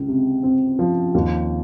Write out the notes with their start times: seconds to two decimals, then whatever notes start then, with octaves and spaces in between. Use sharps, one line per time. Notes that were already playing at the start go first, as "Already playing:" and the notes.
Already playing: C#2
0.08 C3
0.43 C4
0.79 F3
1.14 D#2